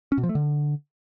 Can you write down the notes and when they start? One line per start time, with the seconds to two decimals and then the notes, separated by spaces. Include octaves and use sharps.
0.12 C#4
0.18 B2
0.23 F3
0.29 A3
0.35 D3